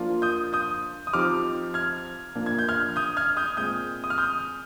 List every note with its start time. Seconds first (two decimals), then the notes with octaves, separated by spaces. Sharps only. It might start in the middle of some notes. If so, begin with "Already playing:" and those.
Already playing: F3 A#3 D4 F4
0.22 D#6 G6
0.53 D#6 G6
1.07 D#6
1.13 F3 C4 D#4 G4 D6 F6
1.74 F6 G#6
2.35 A#2 F3 A#3 D4
2.46 G#6
2.59 G6
2.69 F6 G#6
2.96 D#6 G6
3.17 F6 G#6
3.37 D#6 G6
3.57 A#2 G#3 C4 D#6 G6
4.04 D#6
4.10 F6
4.18 D#6 G6